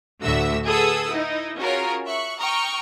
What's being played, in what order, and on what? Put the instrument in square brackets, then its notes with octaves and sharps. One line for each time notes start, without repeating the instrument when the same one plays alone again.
[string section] D2 A2 D3 F#4 E5 E6
G#4 A4 B4 F#5 D#6 E6
D#4 E4
C#4 F4 F#4 G#4 A#4 C#5
E5 C#6 F#6
G5 A#5 C#6 D#6 F6